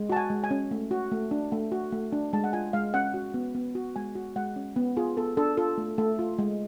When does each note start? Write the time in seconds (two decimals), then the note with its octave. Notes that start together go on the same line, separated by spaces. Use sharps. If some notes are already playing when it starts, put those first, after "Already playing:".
Already playing: G#3
0.10 F#4 A5
0.16 G#5
0.30 G#3
0.44 G#5
0.51 C#4
0.71 A3
0.91 F#4
1.12 A3
1.31 D4
1.52 A3
1.72 F#4
1.92 A3
2.13 D4
2.33 G#3 A5
2.44 F#5
2.53 F4 G#5
2.73 G#3 F5
2.94 C#4 F#5
3.14 F#4
3.34 B3
3.55 B3
3.75 F#4
3.96 G#3 G#5
4.15 F#4
4.36 G#3 F#5
4.56 C#4
4.76 B3
4.97 F4 G#4
5.17 B3 A4
5.37 D4 A4
5.57 F4 A4
5.78 A3
5.98 A3 A4
6.19 F4
6.39 G#3